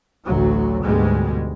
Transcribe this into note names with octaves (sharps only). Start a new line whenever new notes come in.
A1 D2 F#3
D2 G#2 B2 G3 G#3